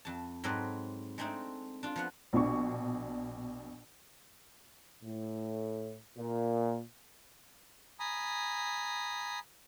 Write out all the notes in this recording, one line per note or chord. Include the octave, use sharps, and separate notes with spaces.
F2 A5
G#2 F#3 C4 A4 B4 D#5
G#3 A3 C4 D4 D#4
D4 F4
F3 B3 F#5
A#1 B2 D4 C#6
A2
A#2
G#5 A#5 B5 D#6